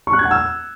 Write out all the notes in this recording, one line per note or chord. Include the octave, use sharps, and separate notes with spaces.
C#6
F#6
G#6
F#5
E6